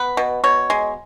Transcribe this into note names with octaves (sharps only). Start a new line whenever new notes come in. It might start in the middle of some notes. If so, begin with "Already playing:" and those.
Already playing: B3 B4
B2
B2 C#5
G#3